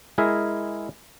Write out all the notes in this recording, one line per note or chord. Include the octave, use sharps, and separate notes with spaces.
G#3 E4 G#4 A#4 E5